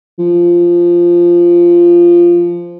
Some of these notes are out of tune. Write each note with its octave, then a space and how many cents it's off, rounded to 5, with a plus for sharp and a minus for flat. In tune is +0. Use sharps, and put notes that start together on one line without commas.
F3 -10